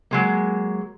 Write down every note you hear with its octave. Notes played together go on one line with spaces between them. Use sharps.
F#3 G#3 A#3